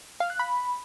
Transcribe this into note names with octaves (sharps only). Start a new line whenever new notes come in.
F5
F#6
B5